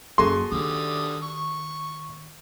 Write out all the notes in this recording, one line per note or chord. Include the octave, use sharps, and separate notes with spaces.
F#2 A#3 F#4 G#4 A4 C6
D3 D#3 G3 D#6
C#6